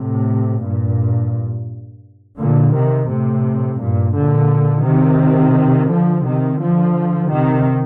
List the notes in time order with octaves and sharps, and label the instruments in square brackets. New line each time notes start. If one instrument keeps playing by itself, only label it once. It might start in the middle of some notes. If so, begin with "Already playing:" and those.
Already playing: [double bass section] A2 C3
G2 A#2
A#2 D3
C3 D#3
A2 C3
G2 A#2
A#2 D3
C3 D#3
D3 F3
C3 D#3
D3 F3
C3 D#3